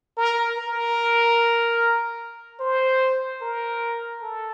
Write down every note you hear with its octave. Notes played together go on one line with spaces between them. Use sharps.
A#4
A#4
C5
A#4
A4